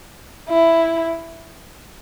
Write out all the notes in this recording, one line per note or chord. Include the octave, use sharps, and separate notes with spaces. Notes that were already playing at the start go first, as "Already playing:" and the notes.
E4